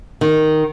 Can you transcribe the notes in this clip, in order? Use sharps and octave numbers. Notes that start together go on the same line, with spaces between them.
D#3